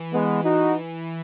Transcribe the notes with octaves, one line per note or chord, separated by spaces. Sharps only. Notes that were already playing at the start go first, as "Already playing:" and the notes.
Already playing: E3
G#3 B3
D#4 F#4